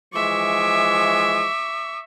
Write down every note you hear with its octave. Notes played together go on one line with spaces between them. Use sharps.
E3 F3 G#3 E5 C#6 D6